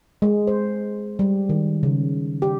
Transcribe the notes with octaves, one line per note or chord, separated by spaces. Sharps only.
G#3
C5
G3
D#3
C#3
G4